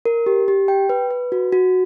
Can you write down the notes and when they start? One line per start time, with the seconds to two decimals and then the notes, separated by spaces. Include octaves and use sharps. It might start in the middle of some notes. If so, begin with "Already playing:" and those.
0.05 A#4
0.26 G4
0.48 G4
0.68 G5
0.89 B4
1.11 B4
1.32 F#4
1.52 F#4